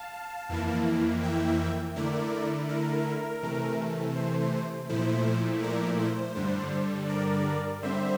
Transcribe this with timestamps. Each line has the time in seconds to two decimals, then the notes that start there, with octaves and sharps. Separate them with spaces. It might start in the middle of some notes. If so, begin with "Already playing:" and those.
Already playing: F5 A5
0.49 F2 E3 A#3 E4
1.23 E5 G5
1.96 D3 A3 E4 A#4 D5
2.69 A#4
3.43 C3 E3 A3
4.16 C5
4.89 A#2 F3 A3 E4 C5
5.63 A#4 D5
6.00 C5
6.36 G2 D3 G3 D4
7.09 A#4 D5
7.82 D3 G3 C4 C5 E5